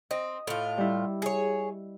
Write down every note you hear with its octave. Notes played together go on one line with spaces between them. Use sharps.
C4 D#5
A2 F4
G3 E4
G#4 C#5